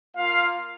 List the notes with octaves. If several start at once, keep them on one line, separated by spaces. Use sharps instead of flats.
A#3 F4 F5